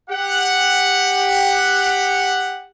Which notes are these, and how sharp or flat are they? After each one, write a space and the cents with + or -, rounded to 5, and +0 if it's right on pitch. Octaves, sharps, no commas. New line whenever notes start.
G4 +15 F#5 +0